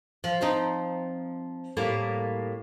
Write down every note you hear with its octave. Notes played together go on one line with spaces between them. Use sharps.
F3
F3 C4 D#4
A2 G3 A#3